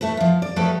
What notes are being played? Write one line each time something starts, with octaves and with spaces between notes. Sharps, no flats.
A3 E4 A4 B4
F3 F4
D5
F3 F#3 A3 G4 A4 B4